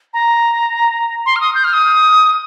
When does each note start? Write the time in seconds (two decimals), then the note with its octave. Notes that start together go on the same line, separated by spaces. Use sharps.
0.13 A#5
1.26 C6
1.36 F6
1.40 D#6
1.55 G6
1.64 F6
1.73 D#6